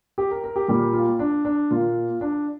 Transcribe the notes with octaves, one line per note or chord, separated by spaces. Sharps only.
G4
A#4
A#4
G4
A#2 G3 A#3 G4
F4
D4
D4
A#2 A#3 F4
D4